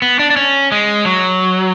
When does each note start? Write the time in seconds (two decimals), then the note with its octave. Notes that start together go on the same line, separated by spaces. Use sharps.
0.02 B3
0.19 D4
0.30 D4
0.36 C#4
0.72 G#3
1.06 F#3